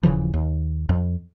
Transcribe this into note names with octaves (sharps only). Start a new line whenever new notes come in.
D#1 C#3 E3 F3
D#2
F2